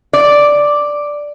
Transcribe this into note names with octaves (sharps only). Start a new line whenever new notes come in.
D5